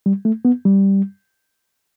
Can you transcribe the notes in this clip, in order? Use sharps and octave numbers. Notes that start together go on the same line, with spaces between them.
G3
A3
B3
G3